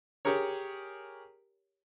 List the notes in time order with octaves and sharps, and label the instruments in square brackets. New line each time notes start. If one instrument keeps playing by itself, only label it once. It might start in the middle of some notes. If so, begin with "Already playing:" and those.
[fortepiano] G4 G#4 A#4 C#5